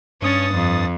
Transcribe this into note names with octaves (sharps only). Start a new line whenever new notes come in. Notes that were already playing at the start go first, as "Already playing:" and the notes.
G2 C#4 D#6 A6
F2